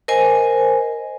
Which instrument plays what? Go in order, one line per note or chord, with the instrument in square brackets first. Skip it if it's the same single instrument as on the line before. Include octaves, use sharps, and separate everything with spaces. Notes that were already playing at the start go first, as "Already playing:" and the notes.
[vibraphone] A#4 C5 D#5 G#5